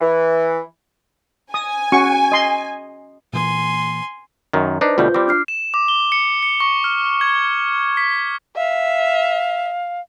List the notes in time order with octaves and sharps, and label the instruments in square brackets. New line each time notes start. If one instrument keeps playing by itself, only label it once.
[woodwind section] E3
[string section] G#5 [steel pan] D#6
[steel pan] C#4 F#4 C#6
D#5 C6
[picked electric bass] A#2 E3 A#3 [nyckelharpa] G#5 C6
[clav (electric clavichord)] F#2 D#3
[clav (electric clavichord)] D4 D#4 [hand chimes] B4 C5
[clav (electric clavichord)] D2 B2 G3 [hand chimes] F4 G6
[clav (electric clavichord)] G3 C4 [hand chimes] D6
[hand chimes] D4 F6 C7
[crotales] E7
D6
G7
C#7
C#7
C#6
F6
G#6
B6
[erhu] E5 [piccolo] F5